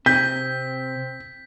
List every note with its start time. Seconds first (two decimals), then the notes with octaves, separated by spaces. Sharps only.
0.06 C3 C4 G6 B6